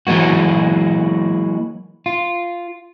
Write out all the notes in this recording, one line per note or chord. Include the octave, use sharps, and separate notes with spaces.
E3 F#3 G#3 A#3 F#4
F4